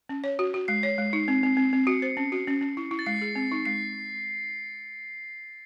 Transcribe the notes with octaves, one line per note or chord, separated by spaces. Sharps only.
C#4
C#5
F#4
F#4
G#3 C7
C#5
G#3
D#4
C4
C4
C4
C4
F#4 C#7
C5
C#4
F#4
C#4
C#4
E4
E4
A6
G#3 C7
G#4
C4
D#4
G#3 C7